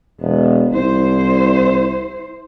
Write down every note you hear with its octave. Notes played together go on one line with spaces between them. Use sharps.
E1 B3
C2 E4 C5